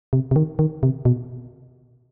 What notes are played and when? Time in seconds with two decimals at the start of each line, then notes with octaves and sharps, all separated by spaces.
0.13 C3
0.31 C3
0.36 D#3
0.59 D#3
0.83 C3
1.05 B2